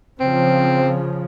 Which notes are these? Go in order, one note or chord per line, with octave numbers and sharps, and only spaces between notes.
C#3 F3 C4